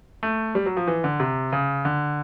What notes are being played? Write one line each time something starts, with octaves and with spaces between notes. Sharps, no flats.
A3
G3
F#3
F3
E3
D3
C3
C#3
D3